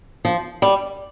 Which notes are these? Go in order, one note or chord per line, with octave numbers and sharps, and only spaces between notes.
F3
G3